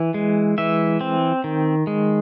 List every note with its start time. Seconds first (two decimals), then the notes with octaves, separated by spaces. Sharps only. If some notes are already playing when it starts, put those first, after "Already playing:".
Already playing: E3
0.14 G#3
0.58 E3 E5
1.01 C4
1.44 D#3
1.87 G#3